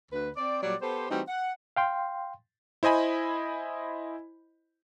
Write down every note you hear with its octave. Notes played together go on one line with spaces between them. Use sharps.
D2 B4
C4 D5
A#2 F#3 G3 D5
B3 G4 A4 C5
E3 G3 A3 C4 D#4 F#4
F#5
F5 G5 C6
E4 C5 D#5 G#5 B5